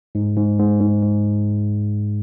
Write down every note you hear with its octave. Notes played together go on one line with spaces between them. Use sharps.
G#2
G#2
G#2
G#2
G#2